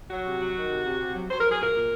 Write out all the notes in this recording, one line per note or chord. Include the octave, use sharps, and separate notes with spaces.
F#3 F#4
C3
F#3
D#3
C3
C3
C3
F#3
F#3 C5
F#3 A#4
G#4
A#2 A#4
A#2